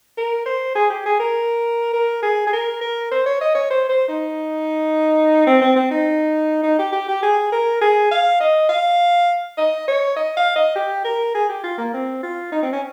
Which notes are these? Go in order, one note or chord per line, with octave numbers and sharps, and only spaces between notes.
A#4
C5
G#4
G4
G#4
A#4
A#4
G#4
G#4
A#4
A#4
C5
C#5
D#5
C#5
C5
C5
D#4
C4
C4
C4
D#4
D#4
G4
G4
G4
G#4
A#4
G#4
F5
D#5
F5
D#5
C#5
D#5
F5
D#5
G4
A#4
G#4
G4
F4
A#3
C4
F4
D#4
C4
C#4